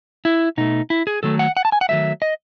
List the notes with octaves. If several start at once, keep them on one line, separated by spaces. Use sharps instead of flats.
E4
B2 A3 D#4
E4
G#4
D#3 F#3 A3 A4
F#5
F#5
A5
G#5
F#5
D#3 F#3 A3 E5
D#5